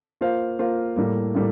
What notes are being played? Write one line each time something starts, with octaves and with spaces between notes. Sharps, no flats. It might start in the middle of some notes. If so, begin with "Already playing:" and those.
A#3 F4 C5 F5
A#3 F4 C5 F5
A2 G3 A#3
A2 G3 A#3